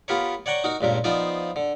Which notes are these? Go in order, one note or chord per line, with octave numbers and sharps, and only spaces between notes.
B3 F4 G4 A#4 B4 C#5
C#5 D5 F#5 G5 A#5 C#6
D#4 F#4 A#4
C#2 G2 A#2 A#4
F3 B3 D#4 F4 C5 D5
D3